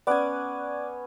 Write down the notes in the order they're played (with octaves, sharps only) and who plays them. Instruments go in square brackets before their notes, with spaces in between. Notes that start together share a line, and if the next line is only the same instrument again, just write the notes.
[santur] B3 C#4 G#5 [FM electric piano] D5 D6 F#6